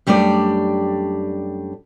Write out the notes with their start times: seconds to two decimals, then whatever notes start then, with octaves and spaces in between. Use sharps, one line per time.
0.07 F#2 G3 A3 D4 D5